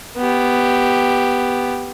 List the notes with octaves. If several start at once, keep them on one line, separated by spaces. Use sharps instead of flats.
B3 G4